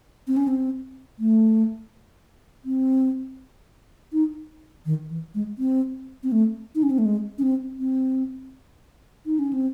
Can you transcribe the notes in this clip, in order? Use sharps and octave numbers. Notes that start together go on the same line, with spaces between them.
C4
C#4
C4
A3
C4
D#4
D#3
E3
G#3
C4
C4
A3
D#4
C#4
C4
A3
G#3
C#4
C4
C4
D#4
C#4
C4